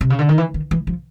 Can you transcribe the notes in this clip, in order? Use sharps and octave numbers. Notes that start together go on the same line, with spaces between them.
C3
C#3
D3
D#3
E3
D#3
E3
F3